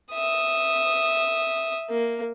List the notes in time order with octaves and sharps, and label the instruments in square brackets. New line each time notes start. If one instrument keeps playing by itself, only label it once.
[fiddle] E5 D#6
A#3